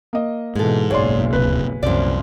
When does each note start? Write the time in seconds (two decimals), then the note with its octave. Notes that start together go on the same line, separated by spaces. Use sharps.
0.13 A#3 D#5
0.55 G#2 B2 E3 G#3 A4
0.91 F#1 B1 C#3 G#3 C#5 D5 C6
1.33 D1 C#2 C3 B4
1.83 C2 F#2 A#2 F3 D5